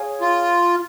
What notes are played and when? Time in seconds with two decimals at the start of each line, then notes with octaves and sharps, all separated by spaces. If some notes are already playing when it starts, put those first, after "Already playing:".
Already playing: G#4 C#5 F5 G#5
0.21 F4